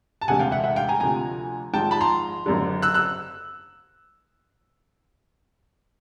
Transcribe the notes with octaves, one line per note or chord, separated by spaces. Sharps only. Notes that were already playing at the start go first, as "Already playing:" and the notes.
A5
E1 D2 C3 F#5 G#5
F5 G5
E5 F#5
E5 F#5
F5 G5
G#5 A#5
D2 C3 F3 G#5 A#5
G#1 G#2 F3 G5 A5
A5 B5
A#5 C6
F#1 F#2 D3
E6 F#6
E6 F#6